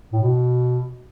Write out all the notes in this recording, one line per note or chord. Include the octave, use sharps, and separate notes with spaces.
A2
B2